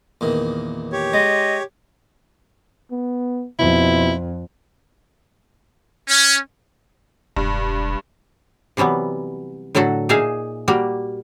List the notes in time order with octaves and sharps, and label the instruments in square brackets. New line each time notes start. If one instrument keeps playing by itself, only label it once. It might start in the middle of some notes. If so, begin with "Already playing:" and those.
[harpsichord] E2 A#2 D#3
[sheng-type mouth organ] G4 C#5
[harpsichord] G#3 [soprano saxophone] D#5
[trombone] B3
[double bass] F2 [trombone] B2 [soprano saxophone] E4
[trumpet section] C#4
[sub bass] E1 [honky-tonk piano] G2
[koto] C3 E3 F#3 G3 B3
A2 D3 F#3 F#4 A4
A#2 D#4 G#4 E5 F5 G#5
G3 A#3 F#4 G4